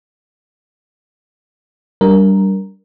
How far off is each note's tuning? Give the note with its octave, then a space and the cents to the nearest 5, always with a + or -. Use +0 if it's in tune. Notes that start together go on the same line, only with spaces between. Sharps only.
G3 -15 D4 -10 A#4 +0